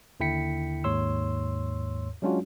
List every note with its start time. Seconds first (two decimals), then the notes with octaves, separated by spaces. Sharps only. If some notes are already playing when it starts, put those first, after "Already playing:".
0.20 D#2 D3 E4 G5 B6 C#7
0.84 D#2 G#2 C#5 C6 E6
2.22 F#3 G#3 C#4 D4 F4 F#4